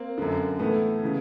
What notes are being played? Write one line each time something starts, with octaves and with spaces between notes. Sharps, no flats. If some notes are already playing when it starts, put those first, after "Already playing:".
Already playing: A#3 C4
F#2 D3
A2 E3 A3 B3
C#3 E3